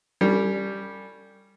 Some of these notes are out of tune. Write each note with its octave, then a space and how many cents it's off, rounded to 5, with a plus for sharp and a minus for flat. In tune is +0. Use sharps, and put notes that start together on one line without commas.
G3 +0 C#4 +5 A4 +45